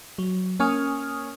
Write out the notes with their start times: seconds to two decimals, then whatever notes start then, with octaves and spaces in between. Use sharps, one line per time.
0.18 F#3
0.60 A#3 C#4 G#5 C#6 D#6 F6